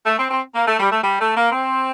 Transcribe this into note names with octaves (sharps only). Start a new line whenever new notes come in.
A3
C4
C4
A#3
A3
G3
A3
G3
A3
A#3
C4